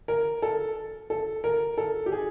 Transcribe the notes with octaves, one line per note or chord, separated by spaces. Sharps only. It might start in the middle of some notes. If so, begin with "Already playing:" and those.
A#4
A4
A4
A#4
A4
G4
G#4